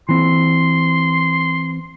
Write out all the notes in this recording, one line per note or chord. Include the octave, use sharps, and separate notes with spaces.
E3 C4 C6